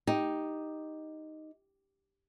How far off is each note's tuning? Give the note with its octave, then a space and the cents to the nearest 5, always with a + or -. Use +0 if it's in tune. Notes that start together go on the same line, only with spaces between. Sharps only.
D#4 +0 G4 +0